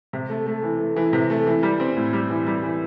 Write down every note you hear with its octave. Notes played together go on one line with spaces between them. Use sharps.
C3
A3
A3
E3
A3
E3
C3
A3
E3
G3
C4
A2
G3
E3
G3
E3